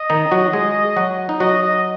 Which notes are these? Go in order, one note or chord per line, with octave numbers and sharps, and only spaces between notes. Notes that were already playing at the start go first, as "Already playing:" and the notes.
Already playing: D#5
D#3 D#4
F#3 F#4
G#3 G#4
F#3 F#4
D#4
F#3 F#4 D#5
D#5